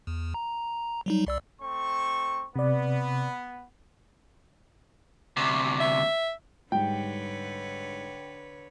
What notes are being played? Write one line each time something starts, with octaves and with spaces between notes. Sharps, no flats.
E2
A#5
F#3 G3 D#4
C2 D5 E6
A3 C4 C#6
C3 B3 D5
D2 C3
E5
G#2 D3 G3 B4 C#5 G5